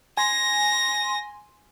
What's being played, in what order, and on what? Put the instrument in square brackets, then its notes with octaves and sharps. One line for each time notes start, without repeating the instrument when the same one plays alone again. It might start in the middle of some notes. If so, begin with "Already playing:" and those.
[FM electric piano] G#5 C6 [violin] A#6